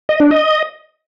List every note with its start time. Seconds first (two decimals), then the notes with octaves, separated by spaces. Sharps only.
0.09 D#5
0.20 D4
0.31 D#5